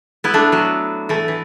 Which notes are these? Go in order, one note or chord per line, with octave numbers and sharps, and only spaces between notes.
B3 E4
A3 D4
F#3 B3
E3 A3
E3